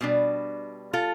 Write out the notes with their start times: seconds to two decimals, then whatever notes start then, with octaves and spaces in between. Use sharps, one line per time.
0.01 B2 G3 D4
0.93 F4 A4